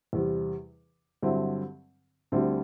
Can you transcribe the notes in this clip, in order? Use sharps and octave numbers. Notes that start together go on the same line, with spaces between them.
E2 C3 G3
G2 D3 F#3 C4 E4
D2 D3 G3 C4 E4